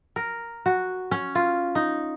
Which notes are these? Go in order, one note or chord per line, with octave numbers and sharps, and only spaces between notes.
A#4
F#4
C#4
F4
D#4